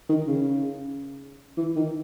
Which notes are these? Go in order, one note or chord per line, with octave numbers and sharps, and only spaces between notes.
D#3
C#3
E3
D#3